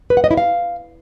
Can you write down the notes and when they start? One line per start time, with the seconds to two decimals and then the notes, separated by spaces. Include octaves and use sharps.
0.10 B4
0.17 F#5
0.24 D#5
0.31 E4
0.37 F5